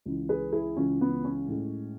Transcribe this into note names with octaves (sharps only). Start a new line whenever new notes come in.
C#2 C#3 E3
G#4 B4
E4 G#4
C#2 C#3 E3 C#4
B3
C#4
A2 G#3